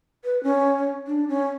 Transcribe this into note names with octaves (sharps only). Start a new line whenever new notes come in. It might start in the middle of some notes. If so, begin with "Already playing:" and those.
B4
C#4
D4
C#4